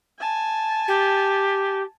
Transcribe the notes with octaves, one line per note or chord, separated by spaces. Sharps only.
G#5 A5
G4